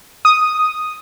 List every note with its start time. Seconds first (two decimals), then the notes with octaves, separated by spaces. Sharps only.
0.25 D#6